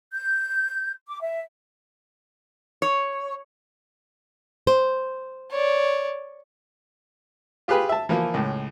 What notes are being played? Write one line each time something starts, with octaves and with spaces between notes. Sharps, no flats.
G6
D6
E5
C#5
C5
C#5 D5
F4 G4 G#4 B4 B5
E5 A5
E3 F3 A#3 F4
C#2 A2